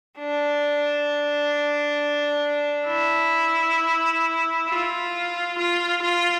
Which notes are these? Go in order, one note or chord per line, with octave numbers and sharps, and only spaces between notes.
D4
E4
F4
F4
F4